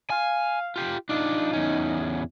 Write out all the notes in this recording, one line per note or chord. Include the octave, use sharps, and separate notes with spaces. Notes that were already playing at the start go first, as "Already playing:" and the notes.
F5 G#5
F4 G4
D4 D#4 F4
E2 C#4